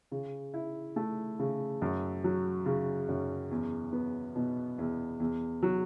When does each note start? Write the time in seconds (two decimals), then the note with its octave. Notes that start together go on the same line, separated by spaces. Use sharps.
0.12 C#3
0.54 E4
0.96 A3
1.39 C#3
1.82 F#2
2.24 F#3
2.66 C#3
3.09 F#2
3.51 E2
3.92 B3
4.35 B2
4.78 E2
5.20 E2
5.62 F#3